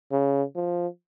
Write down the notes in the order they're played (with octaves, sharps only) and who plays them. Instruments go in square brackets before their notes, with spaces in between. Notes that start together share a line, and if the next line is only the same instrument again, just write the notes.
[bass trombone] C#3
F3